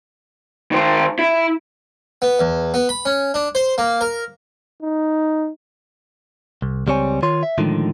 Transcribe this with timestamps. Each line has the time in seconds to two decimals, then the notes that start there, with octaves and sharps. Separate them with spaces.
0.72 D#3 C5
1.19 E4
2.22 B3
2.39 E2
2.74 B3
2.89 B5
3.05 C#4
3.34 D4
3.55 C5
3.78 A#3
4.01 A#4
4.82 D#4
6.62 C2
6.87 C#2 G3 C4 C#5 G#5
7.22 D#3 F4 C#5 C6
7.43 E5
7.58 A2 D3 D#3 F3 G#3